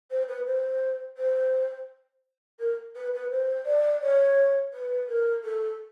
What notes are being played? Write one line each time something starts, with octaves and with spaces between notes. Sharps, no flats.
C5
B4
C5
C5
A#4
B4
B4
C5
D5
C#5
B4
A#4
A4